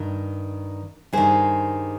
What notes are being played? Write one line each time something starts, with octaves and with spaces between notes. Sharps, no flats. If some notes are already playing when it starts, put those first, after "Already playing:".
Already playing: G2 D#3
G2 D#3 G#4 C5